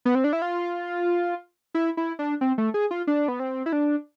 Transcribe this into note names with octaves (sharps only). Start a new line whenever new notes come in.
B3
C4
D4
E4
F4
E4
E4
D4
C4
A3
G#4
F4
D4
B3
C4
E4
D4